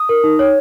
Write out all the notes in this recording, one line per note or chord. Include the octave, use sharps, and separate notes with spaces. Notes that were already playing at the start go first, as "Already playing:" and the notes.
Already playing: D#6
A#4
D#4
C#5